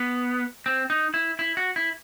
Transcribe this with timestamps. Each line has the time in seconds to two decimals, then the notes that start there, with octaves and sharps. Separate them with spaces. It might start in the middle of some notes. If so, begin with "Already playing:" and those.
Already playing: B3
0.66 C4
0.90 D#4
1.14 E4
1.39 E4
1.57 F#4
1.76 E4